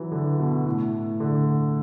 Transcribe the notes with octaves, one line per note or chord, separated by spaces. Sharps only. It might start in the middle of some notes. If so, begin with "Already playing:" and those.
Already playing: E3 F#3
D3
B2
A2
D3